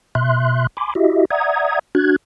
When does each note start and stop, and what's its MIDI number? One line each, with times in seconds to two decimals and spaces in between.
0.15 0.67 47
0.15 0.67 76
0.15 0.67 84
0.15 0.67 90
0.77 0.94 80
0.77 0.94 83
0.77 0.94 84
0.77 0.94 86
0.95 1.25 64
0.95 1.25 66
0.95 1.25 67
0.95 1.25 75
0.95 1.25 76
1.30 1.79 74
1.30 1.79 76
1.30 1.79 78
1.30 1.79 82
1.30 1.79 87
1.30 1.79 92
1.95 2.16 62
1.95 2.16 66
1.95 2.16 90
1.95 2.16 92